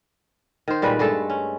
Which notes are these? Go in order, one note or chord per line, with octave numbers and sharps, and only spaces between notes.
D#3 C5
A#2 G3 G#3 B4
G2 G#3 A3 A4
C#4